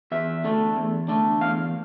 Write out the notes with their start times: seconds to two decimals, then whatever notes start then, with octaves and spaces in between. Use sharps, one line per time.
0.12 E2 E5
0.44 D3 A3 D4
0.76 E2
1.08 D3 A3 D4
1.41 E2 F5